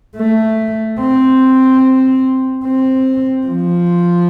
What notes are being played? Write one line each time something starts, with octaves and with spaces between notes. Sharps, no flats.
A3
C4
C4
F3